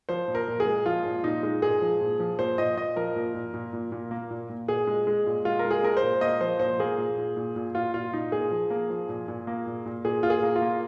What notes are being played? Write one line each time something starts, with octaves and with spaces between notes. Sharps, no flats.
F3 C5
A#2
A#4
A#2
G#4
G#3
F3 F4
A#2
A#2 D#4
G#3
A#2 G#4
F3
A#2
F3
A#2 C5
A#2 D#5
A#2 D#5
F3 A#4
A#2
A#2
A#2
A#2
A#2
A#3
A#2
A#2
A#2 G#4
G#3
G#3
A#2
G#3 F4
A#4
G#3
G#4
G#3 A#4
C5
A#2
A#3 D#5
F3 C5
A#2 C5
A#3 G#4
A#2
A#2
A#2
A#2
A#2 F4
A#2 F4
A#2 D#4
A#2 G#4
F3
A#3
F3
A#2
A#2
A#3
A#2
A#2
A#2 G#4
A#2 F4
G#4
A#3
F4
A#3